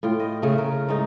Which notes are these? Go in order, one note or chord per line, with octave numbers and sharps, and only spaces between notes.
A2 F4 G5
D#5
C#3 A3
A#4
G#2 A3 D#4